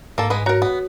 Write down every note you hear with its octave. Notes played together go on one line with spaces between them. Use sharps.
G#2 A#3 A4
G#3 G#4 B4
F#4 A#4 C#5 A#5
B3